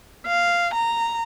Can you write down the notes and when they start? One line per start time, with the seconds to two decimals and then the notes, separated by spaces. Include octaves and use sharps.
0.27 F5
0.74 A#5